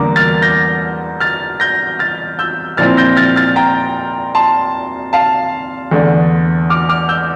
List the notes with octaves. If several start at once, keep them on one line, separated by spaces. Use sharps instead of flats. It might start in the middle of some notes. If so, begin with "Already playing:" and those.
Already playing: E2 D3 G3 A#3 A#5 D6
F6 A6
G6 A#6
F6 A6
G6 A#6
F6 A6
E6 G6
A#2 F3 C4 E4 F6 A6
G6 A#6
F6 A6
F6 A6
G5 A#5
A5 C6
F5 A5
E2 D3 A3 D4
D6 F6
D6 F6
E6 G6